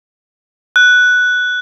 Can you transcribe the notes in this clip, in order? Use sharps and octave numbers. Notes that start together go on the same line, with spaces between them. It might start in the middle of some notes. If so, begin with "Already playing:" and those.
F#6